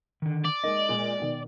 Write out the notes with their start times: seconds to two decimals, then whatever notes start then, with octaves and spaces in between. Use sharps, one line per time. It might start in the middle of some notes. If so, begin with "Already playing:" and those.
0.22 D3 D#3
0.45 D5
0.64 G#3 A#3 D#4 D#5
0.89 A#2 G#3
1.20 B2 D#3